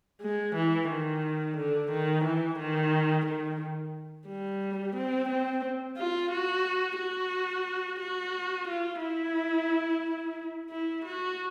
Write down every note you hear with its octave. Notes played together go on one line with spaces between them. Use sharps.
G#3
E3
D#3
D3
D#3
E3
D#3
D#3
G3
C4
C4
F4
F#4
F#4
F#4
F4
E4
E4
F#4